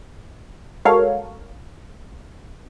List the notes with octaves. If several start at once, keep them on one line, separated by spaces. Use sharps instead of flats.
G#3 F#4 A4 A#4 C#5 F5